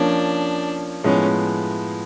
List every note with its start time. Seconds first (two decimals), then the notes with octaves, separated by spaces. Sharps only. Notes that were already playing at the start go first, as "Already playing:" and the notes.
Already playing: F3 A#3 C#4 D4
1.04 A2 F3 G#3 B3 C#4